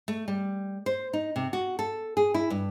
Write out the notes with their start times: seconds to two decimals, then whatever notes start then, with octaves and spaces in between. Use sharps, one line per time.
0.08 A3
0.28 G3
0.86 C5
1.13 D#4
1.36 C3
1.53 F#4
1.79 A4
2.17 G#4
2.34 E4
2.50 G2